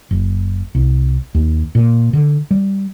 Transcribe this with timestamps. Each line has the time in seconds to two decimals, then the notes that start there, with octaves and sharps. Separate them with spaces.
0.11 F#1
0.75 C2
1.35 D#2
1.75 A#2
2.13 D3
2.51 G3